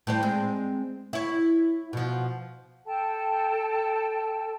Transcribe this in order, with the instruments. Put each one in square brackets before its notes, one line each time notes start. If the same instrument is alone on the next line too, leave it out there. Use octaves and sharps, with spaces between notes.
[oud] A2 G3 C5
G#3 C4
E4 C#5
B2 F3
[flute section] A4 G5 A5